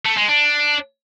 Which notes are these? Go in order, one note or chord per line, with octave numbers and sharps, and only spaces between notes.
A3
G#3
D4